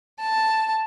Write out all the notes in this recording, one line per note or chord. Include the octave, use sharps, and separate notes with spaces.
A5